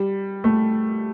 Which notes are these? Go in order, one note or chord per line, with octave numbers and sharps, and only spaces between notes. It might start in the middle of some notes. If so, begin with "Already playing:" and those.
Already playing: G3
A3